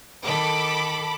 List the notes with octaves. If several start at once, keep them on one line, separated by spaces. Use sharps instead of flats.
D#3 A4 B5 D6